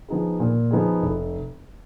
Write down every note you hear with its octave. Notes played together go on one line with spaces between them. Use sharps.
F3 B3 D#4 G#4
A#2
F3 B3 D#4 G#4
F1